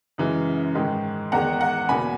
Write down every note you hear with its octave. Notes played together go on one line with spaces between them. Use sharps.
F#2 C#3 E3 G#3
G#2 D#3 G#3
E2 D#3 G#3 F#5 A#5
F#5 A#5
E2 B2 A#3 G#5 B5